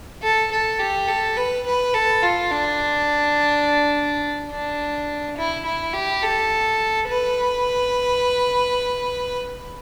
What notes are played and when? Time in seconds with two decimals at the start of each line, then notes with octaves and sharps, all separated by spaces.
0.23 A4
0.52 A4
0.79 G4
1.08 A4
1.37 B4
1.66 B4
1.94 A4
2.22 F4
2.51 D4
4.51 D4
5.37 E4
5.65 E4
5.94 G4
6.23 A4
7.08 B4